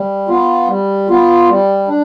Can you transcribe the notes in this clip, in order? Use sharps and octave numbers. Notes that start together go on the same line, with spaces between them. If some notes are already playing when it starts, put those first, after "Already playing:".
Already playing: G3
B3 F4
G3
B3 F4
G3
D4